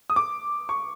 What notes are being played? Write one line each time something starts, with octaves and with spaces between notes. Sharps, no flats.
D#6
D6
C#6